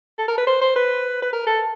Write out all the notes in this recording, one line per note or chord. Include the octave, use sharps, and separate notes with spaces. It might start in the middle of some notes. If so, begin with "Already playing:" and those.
A4
A#4
B4
C5
C5
B4
B4
A#4
A4